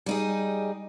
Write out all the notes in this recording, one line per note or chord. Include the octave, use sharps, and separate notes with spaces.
G3 D#4 G#4